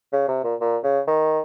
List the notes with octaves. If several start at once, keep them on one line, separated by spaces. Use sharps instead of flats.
C#3
C3
A#2
A#2
C#3
D#3